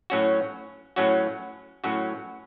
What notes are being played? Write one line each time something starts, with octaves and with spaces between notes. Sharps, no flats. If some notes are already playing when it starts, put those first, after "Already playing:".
A2 F#3 C#4 F#4
A2 F#3 C#4 F#4
A2 F#3 C#4 F#4